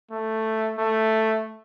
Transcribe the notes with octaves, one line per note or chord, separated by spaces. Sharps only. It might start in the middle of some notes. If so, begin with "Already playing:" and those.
A3
A3